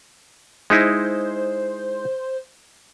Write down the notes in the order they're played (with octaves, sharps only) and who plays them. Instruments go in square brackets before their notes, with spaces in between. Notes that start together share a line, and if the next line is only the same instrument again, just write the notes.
[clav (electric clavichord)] G#3 D#4 E4 [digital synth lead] C5